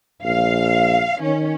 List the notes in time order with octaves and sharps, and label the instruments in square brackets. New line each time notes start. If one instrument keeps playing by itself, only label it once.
[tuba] A#1 [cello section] F5
[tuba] D#3 [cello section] C#4